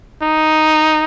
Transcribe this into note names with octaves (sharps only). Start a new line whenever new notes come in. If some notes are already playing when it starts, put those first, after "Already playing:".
D#4